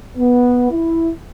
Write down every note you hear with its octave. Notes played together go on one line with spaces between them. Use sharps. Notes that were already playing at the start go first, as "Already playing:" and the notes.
B3
E4